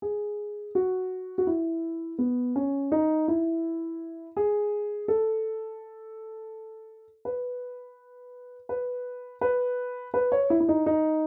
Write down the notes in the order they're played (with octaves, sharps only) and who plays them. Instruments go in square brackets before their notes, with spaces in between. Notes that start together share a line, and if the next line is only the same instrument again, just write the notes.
[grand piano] G#4
F#4
F#4
E4
B3
C#4
D#4
E4
G#4
A4
B4
B4
B4
B4
C#5
E4
E4
D#4
D#4